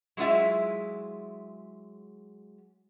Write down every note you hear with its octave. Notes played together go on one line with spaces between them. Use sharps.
F#3 G#3 E4 F4 E5